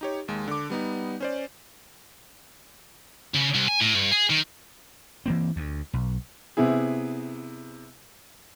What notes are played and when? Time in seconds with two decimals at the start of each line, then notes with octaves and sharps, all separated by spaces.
0.01 D#4 G4 C#5
0.28 D#2 G#3
0.48 D3 D6
0.70 G3 B3 D#4
1.20 C#4 C5 D5
3.35 C#3
3.55 C2
3.68 G#5
3.81 A2
3.95 G2
4.11 G#4
4.30 D#3
5.26 E3 A#3 C4
5.56 D2
5.93 B1
6.57 C3 B3 E4 G#4